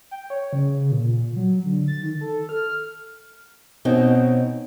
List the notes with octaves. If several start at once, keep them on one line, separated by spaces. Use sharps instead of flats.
G5
C#5
C#3
A#2
F#3
D3
A6
D#3
A4
F6
B2 C4 C#4 D#4